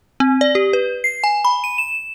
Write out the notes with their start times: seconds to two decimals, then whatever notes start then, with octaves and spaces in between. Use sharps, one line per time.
0.20 C4
0.41 D5
0.55 G4
0.73 B4
1.04 C7
1.24 G#5
1.45 B5
1.64 D#7
1.78 E7